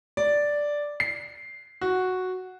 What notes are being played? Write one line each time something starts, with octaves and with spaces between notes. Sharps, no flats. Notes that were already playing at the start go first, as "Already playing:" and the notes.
D5
C7
F#4